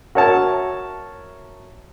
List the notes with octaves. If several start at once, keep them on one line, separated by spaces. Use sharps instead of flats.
F#4 A#4 C#5 E5 A5